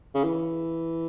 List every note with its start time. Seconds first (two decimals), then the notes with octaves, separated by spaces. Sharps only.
0.14 C#3
0.24 E3